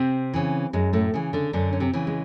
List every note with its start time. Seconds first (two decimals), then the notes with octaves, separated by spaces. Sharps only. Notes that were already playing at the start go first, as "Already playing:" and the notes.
Already playing: C3 C4
0.34 C#3 E3
0.73 F#2 G#3
0.93 A2 A3
1.14 C#3 E3
1.33 D3 D4
1.53 F#2 D3 D4
1.73 C#4
1.80 C3 C4
1.93 C#3 E3
2.07 G#3